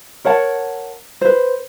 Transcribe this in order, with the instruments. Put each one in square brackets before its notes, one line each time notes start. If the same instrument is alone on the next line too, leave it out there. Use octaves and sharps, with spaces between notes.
[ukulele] A#4 C#5 F#5 A5
B4 C5